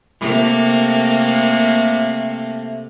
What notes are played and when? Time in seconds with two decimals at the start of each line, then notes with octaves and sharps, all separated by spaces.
0.20 C3 A3 A#3